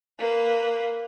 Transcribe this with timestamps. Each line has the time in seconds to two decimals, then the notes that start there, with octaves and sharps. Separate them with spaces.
0.19 A#3 B4